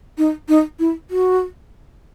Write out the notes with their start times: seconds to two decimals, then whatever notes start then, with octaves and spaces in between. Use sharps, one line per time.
0.18 D#4
0.49 D#4
0.79 E4
1.11 F#4